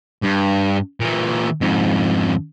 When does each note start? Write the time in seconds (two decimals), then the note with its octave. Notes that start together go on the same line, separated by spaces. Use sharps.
0.22 G2
1.00 A#2 E3
1.61 F2 G#2